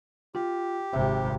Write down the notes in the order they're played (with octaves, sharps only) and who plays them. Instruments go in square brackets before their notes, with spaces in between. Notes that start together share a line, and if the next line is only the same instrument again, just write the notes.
[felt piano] F4 [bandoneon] G4
[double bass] G#1 C3 [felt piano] E5